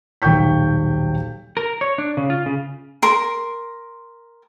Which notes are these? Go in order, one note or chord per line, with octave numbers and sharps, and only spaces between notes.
D#1 B1 G5 C#6 G6 B6
A#4
C#5
D4
C#3
F4
C#3
A#4 C6